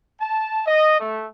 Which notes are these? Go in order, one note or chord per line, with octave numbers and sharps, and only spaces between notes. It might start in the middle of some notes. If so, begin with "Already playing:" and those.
A5
D#5
A3